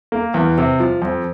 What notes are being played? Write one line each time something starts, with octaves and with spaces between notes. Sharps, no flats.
A#3
E2
C3
F3
F2